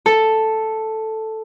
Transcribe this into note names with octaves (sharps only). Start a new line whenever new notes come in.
A4